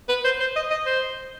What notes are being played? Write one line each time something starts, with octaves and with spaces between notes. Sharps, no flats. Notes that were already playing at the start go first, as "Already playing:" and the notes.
B4
C5
C5
D#5
D#5
C5